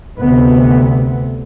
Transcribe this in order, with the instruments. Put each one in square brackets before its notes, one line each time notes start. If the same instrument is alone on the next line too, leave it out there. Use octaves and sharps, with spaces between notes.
[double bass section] D2 C3 B3